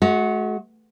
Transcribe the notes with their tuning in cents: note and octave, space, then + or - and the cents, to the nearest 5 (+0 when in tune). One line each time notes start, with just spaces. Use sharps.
G#3 +45 F#4 -5